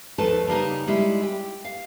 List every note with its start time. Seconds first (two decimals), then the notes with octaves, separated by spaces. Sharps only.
0.18 D#2 F3 A3 A4 B4 A5
0.47 C#3 G3 A#3 D#4
0.87 G3 G#3 E4
1.23 G4 G5
1.65 F5